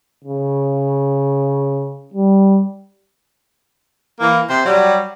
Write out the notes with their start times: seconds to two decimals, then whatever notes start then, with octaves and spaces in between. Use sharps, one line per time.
0.24 C#3
2.14 G3
4.20 E3 A#3
4.48 C3 C5
4.66 F#3 G3